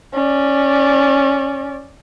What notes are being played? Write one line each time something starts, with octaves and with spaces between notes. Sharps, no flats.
C#4 D5